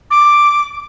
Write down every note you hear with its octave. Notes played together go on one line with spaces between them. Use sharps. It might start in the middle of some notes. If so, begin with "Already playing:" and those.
D6